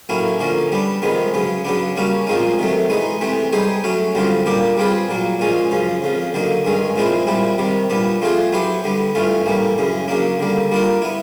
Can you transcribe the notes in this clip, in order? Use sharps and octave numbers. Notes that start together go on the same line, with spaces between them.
A2 F#3 A#3 C#4 E4
D3 F3 A#3 C#4
G3 B3 D4
F2 C3 D#3 G#3 B3
C#3 F#3 B3
C#3 F#3 B3 D4
G3 A#3 C#4 F#4
A#2 F3 G#3 C4 D#4
C3 D#3 F#3 A3
E3 G#3 B3 D#4
C3 E3 A3 C4
G3 B3 D#4 G#4 C5
F#3 A3 C#4 F#4
F#2 D3 G3 C4 F4
A#2 G3 A#3 D4 G4
G3 C4 F4 G#4 B4
A#2 F#3 A#3
A#2 F3 G#3 C#4
F#2 C#3 F3
F2 C#3 F3
D3 F#3 A#3 D#4
G2 D#3 G#3 C#4
A#2 F3 G#3 C4 E4
A#2 G3 C4 E4
C3 D#3 G3
A#2 G3 B3 D4
F3 A3 C4 F4 G#4
F#3 B3 E4 G4 C5
D3 G3 B3
G2 E3 A3 C#4 F4
A2 E3 G3 A#3
F#2 C#3 E3
C#3 F#3 A#3 D4
D3 G3 A#3
G3 A#3 D4 F4 A#4
B3 E4